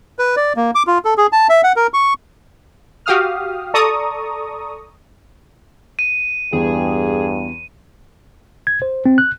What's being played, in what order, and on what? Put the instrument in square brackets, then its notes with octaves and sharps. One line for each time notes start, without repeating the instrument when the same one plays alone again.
[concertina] B4
D5
A#3
D6
F4
A4
G#4
A5
E5
F#5
A#4
C#6
[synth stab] F#4 G4 F5 D#6 F6
A4 D5 A#5 C#6 D#6
[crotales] D#7
[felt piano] E2 G5 [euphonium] G2 [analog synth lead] G#4
[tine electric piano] G#6
C5
C4
F#6